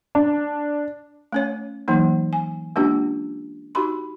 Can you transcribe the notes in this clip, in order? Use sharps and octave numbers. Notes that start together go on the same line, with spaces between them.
D4
A3 C#4 C#5
E3 F#3 A#3 D#4
G#5
G#3 A#3 C#4 D4 F4 G4
D#4 F#4 G4 B5 C6